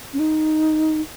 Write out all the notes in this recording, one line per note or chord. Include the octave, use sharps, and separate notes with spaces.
C#4
D#4